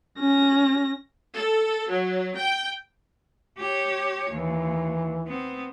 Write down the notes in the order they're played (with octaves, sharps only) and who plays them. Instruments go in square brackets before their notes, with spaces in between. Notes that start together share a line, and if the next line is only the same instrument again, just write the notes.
[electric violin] C#4 A#6
[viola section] A4
F#3
G5
[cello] G4 C#5
[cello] D#2 [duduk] E3
[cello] B3 C4